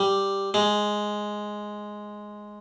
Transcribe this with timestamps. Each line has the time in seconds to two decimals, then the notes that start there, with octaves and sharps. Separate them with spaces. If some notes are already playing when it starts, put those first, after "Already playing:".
Already playing: G3
0.54 G#3